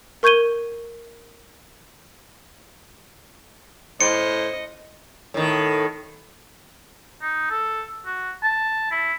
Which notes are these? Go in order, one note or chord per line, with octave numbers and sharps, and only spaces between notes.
A#4 C#6 G6 G#6 D#7 G7
A2 C5 D#5 C#7
A2 D#3
D#4
A4
F#4
A5
E4